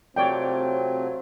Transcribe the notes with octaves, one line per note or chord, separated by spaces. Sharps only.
C3 F#3 A3 C4 F4 C#5 D5 G5